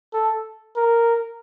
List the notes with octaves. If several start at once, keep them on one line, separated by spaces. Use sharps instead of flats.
A4
A#4